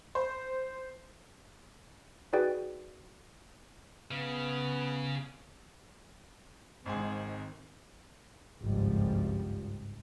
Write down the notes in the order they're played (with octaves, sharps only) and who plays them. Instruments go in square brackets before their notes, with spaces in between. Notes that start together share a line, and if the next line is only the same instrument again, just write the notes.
[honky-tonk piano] C5
[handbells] D#4 F#4 G#4 B4 D5 G5
[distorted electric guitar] C#3 [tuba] B3
[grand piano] G#1 G#2 G#4 [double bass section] D#3 C4
[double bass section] G#1 C#2 G2 F3 G3